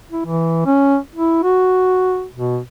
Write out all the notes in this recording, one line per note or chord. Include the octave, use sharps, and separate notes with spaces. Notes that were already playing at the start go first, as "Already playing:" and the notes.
E4
E3
C#4
E4
F#4
B2